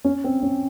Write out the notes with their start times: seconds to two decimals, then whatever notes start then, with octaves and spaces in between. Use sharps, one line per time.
0.05 C#4
0.24 C4
0.43 C#4